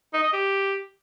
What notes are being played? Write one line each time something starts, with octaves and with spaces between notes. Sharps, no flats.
D#4
D#5
G4